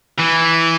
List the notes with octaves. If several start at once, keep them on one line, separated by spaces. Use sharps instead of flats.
E3